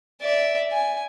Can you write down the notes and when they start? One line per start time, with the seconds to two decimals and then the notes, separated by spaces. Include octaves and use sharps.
0.22 D5 E5
0.72 G#5